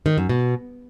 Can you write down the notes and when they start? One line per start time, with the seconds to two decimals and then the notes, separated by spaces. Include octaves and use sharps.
0.06 D#3
0.18 F#2
0.29 B2